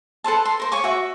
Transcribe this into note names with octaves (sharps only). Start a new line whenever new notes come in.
A4 B4 C5 A5
C6
A#4 C5
C#5 G#5 C#6 D6
F#4 E5